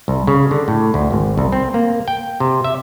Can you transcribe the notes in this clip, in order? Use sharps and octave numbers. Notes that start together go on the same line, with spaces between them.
C2
C#3
D3
A2
D2
G#1
C2
C4
A#3
G5
C3
E5